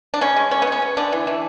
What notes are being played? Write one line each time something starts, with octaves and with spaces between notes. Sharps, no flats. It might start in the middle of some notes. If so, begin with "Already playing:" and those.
D4
C#3 C#4
G#3
B3 C#4
B3
C#3 C#4
B3
D3 B3 D4
E3
E3